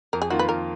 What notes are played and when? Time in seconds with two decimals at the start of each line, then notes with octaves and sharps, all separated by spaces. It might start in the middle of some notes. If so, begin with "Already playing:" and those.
0.13 F2 A#4
0.22 G#4
0.30 D#3 A#3 F4 F#4
0.39 B4
0.48 F2 A#4